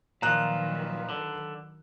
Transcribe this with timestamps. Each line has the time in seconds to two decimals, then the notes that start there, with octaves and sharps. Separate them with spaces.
0.22 A#2 D#3 F3 F#3 B4 A#5 F#6
1.09 D3